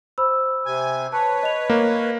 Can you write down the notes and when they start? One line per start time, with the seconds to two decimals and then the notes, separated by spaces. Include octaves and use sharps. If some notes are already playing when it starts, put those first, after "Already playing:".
0.18 C5 B5 E6
0.66 C3 G#5
1.12 B4 C#5 A5
1.43 D#5 F7
1.70 A#3